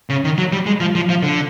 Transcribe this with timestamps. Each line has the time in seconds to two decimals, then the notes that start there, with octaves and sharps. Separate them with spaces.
0.10 C#3
0.24 D#3
0.38 F#3
0.53 G3
0.66 G#3
0.80 F3
0.95 F3
1.09 F3
1.23 D3